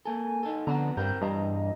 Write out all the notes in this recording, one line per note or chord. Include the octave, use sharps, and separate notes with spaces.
A#3 A4 G#5
D#4 A4
F2 D3 B3 F#5 A#5
G2 C4 A#4 G6
E2 G2 D#5 A#5